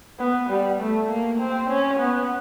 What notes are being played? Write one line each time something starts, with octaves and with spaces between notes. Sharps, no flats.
B3
G3
A3
A#3
C4
C#4
B3